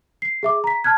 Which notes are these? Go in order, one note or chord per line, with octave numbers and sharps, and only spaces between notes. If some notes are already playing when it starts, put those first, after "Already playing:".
C7
G#4 E5 D6
A#5 B6
A5 F6 F#6 G#6